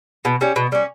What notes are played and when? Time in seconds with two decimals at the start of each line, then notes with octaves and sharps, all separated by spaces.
0.25 B2
0.41 G3 C#4
0.56 B2
0.72 G3 C#4